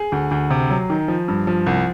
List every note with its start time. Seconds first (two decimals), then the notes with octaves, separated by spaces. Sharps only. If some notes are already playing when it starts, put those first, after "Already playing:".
Already playing: G#4
0.12 D2
0.31 D2
0.50 C3
0.70 F#3
0.90 D#3
1.08 F3
1.28 G2
1.47 F3
1.66 C2